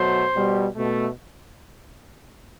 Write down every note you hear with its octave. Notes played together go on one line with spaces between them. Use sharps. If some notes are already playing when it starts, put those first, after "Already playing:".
Already playing: B2 F#3 A3 C5
B2 G3
B2 A3